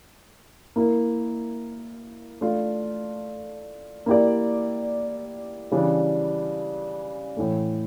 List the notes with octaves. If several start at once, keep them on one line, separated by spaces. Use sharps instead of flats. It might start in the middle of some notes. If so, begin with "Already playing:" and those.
A#3 E4 A#4
A3 D4 F4
A#3 E4 G4 D5
C#3 E3 G3 D4
A2 E3 A3